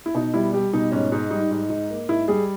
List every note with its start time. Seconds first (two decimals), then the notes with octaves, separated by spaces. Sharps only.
0.06 E4
0.15 B2 D#4
0.34 G3 E4
0.53 G3 G4
0.73 B2 D#4
0.92 G#2 C#4
1.12 G#2 D#4
1.31 G3 D#4
1.51 G#2
1.70 G#2
1.90 A#3
2.09 G#2 E4
2.28 G3 G#4